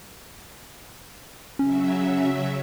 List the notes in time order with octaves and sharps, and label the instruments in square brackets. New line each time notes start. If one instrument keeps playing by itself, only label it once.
[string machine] C#3 F#3 E5 [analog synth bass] C#4